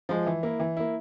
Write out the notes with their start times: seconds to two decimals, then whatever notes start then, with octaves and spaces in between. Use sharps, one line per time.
0.09 F3 G#3
0.26 E3
0.43 A#3 E4
0.60 E3
0.77 A#3 E4